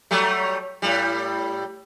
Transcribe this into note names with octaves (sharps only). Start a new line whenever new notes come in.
F#3 G3 A3
A2 G3